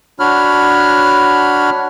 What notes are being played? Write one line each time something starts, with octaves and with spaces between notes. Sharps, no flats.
D4 F#4 C#5 B5 F6